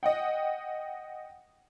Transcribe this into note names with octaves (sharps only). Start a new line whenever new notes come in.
D#5 F#5 G5